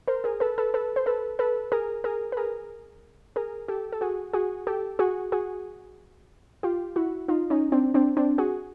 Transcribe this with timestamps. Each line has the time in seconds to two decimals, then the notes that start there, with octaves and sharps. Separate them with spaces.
0.08 A#4 C5
0.24 G#4 A#4
0.40 A4 B4
0.58 A4 B4
0.74 A4 B4
0.96 C5
1.06 A4 B4
1.39 A4 B4
1.72 G#4 A#4
2.04 G#4 A#4
2.32 B4
2.37 G#4 A#4
3.36 G#4 A#4
3.68 G4 A4
3.93 A4
4.01 F#4 G#4
4.33 F#4 G#4
4.67 G4 A4
4.99 F#4 G#4
5.32 F#4 G#4
6.63 F4 G4
6.96 E4 F#4
7.28 D#4 F4
7.50 C#4 D#4
7.72 C4 D4
7.94 C4 D4
8.17 C4 D4
8.38 F#4 G#4